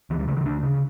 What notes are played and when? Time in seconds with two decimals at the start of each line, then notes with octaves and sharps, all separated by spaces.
0.10 D2 E3
0.19 G3
0.28 C#3 A3
0.37 E3
0.45 D2 D4
0.63 C#3